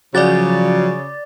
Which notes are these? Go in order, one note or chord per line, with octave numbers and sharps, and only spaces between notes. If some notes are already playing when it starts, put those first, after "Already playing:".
C#3 F3 F#3 F#4 D5 D6 A6